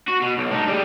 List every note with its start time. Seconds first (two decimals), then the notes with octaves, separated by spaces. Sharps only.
0.08 F#4
0.22 B2
0.38 B1
0.51 A2 D#4
0.67 G3 G#4